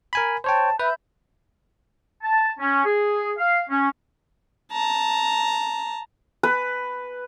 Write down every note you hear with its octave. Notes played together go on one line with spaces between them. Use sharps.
A#4 G#5 B5
C5 C#5 G5 A5
B4 E5 B5 G6
A5
C#4
G#4
F5
C#4
A5 A#5
B4